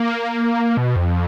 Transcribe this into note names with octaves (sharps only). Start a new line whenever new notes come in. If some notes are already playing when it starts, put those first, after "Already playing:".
Already playing: A#3
B2
F2